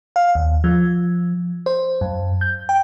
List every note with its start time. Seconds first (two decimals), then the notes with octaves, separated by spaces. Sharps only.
0.16 F5
0.35 D#2
0.64 F3
1.66 C5
2.01 F#2
2.41 G6
2.69 G5